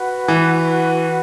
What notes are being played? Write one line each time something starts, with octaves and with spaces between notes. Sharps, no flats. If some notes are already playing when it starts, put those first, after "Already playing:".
Already playing: F#4 B4 F#5
E3